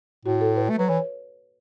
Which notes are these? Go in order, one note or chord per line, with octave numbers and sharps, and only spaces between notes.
A2 F#4
A4
B4
A3
F#3 B4
E3 C#5